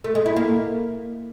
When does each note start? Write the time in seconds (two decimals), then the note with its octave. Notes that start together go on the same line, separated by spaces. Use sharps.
0.04 A3
0.15 G#3
0.26 E4
0.36 A#3